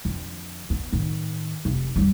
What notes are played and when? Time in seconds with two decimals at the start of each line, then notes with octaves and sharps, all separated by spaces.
0.05 F2 D3
0.70 B3
0.92 A2 D#3
1.65 F1
1.96 F#2 G3